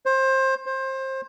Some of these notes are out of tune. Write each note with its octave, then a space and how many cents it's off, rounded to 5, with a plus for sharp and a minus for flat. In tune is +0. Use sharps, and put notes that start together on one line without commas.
C5 +25
C5 +25